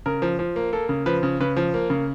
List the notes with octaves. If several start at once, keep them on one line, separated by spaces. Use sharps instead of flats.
C#3 A#4
F3
F3
A#3
A#3 A4
C#3
F3 B4
C#3
C#3 B4
F3
A#3
C#3